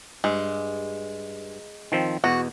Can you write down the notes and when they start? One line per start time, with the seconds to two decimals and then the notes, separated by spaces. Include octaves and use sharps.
0.24 G2 G#3
1.92 D#3 F3 C4
2.24 E2 B2 F#4